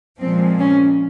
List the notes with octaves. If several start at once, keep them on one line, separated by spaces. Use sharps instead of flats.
A#2 F3 G#3 C4
C#4